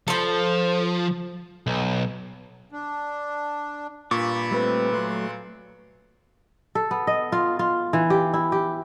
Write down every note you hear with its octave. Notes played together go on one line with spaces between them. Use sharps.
F3 A4 C5
B1
D4
G2 A#2 B5 C#6 D6
G3 A3 C4 B4
F#3 A3 C6 F#6
A4
B3
D#5
F4
F4
E3
G4
E4
G4